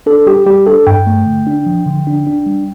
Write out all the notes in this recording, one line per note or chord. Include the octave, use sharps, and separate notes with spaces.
D4 A4
G3 G4
G3 G4
D4 A4
G2 G5
A3
D3
D4
F3
D3
D4
D4
G3